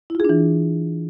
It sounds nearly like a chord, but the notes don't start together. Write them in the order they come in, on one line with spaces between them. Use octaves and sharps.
E4 F4 G#4 D4 E3